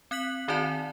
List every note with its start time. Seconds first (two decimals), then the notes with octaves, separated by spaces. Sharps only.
0.11 C4 F#6 B6 F#7
0.48 D#3 C4 D#4 F#4 D5 A5